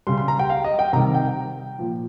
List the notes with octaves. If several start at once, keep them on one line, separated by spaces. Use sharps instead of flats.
C#3 G3 C6
C6
A#5
G5
F5
D#5
G5
C3 D#3 G3 A#5
G5
A#2 F3